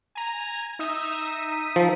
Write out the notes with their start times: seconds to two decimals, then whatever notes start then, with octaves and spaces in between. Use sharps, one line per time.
0.15 G#5 A#5
0.79 D#4 E5 D#6
1.76 F3